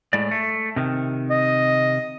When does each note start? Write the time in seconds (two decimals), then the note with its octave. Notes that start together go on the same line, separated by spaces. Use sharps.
0.13 A2 G#3 D5
0.31 A3
0.76 C3 D#3
1.30 D#5